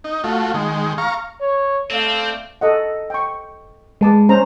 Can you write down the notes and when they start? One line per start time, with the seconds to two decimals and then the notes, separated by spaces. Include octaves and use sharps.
0.04 D#4
0.24 A3 F4 F#4
0.54 D#3 G#3
0.98 F5 A#5 C#6
1.40 C#5
1.91 A3 C4 D5 F5
2.61 A4 D#5 F#5
3.10 G5 C#6
4.01 G#3 B4 A5 D6
4.29 C#4 C5 A#5